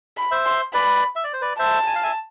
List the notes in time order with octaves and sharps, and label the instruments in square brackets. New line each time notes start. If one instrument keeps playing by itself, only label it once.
[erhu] B5
[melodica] C5 E5
[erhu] C6
[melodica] B4 D5 [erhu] B5
[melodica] E5
D5
C5
B4 D5
[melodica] C5 E5 [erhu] A5
[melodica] G#5
F5
E5 G#5